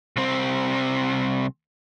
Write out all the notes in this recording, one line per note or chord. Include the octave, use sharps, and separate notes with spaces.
C2 C4